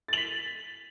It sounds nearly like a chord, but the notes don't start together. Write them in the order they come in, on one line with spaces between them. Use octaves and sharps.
A6 F#7 B6